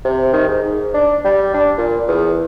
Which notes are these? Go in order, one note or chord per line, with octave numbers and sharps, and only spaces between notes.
C3
D#3
G#2
D4
G3
D4
A#2
E2